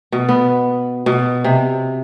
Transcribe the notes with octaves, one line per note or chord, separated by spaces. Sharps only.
B2
B3
B2
C3